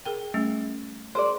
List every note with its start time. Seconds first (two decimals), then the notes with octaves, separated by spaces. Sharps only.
0.05 G#4 A#4 G5
0.34 G3 A3 C#4
1.15 G#4 A#4 C5 D5